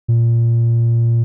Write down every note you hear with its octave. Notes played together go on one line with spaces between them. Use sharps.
A#2